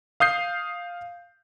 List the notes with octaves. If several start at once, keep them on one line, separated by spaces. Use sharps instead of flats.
F5 D#6 G6 C7